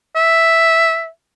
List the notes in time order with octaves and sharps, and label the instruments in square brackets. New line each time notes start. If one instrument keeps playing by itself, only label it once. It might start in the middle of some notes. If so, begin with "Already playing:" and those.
[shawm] E5